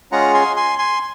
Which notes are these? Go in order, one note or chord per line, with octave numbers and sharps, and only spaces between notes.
G#3 C#4 F4 G#4 F#5 A#5
G#5 C6
G#5 C6
G#5 C6